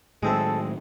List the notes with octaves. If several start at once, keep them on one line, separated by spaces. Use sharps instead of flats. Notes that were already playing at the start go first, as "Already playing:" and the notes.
A2 D#3 F#3 G#3 C4 A4 E5